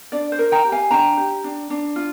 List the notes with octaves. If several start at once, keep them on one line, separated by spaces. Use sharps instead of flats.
D4 D5
C5
A#4
G5 A#5
G4
F5 G#5
D4 G5 A#5
G4
D4
D4
F4